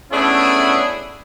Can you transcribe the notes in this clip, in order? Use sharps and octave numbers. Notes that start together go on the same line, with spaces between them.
A3 B3 C#4 D4 E4 G#4